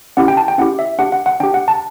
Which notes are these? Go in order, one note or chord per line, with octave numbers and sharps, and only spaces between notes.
C#4 E4 G4 F#5
G5
A5
G5
C#4 E4 G4 F#5
E5
D4 G4 F#5
F#5
F#5
D4 G4 G5
F#5
A5